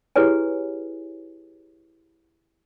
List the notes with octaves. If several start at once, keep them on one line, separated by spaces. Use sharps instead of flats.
E4 G4 G#4 B4 C#5 G#5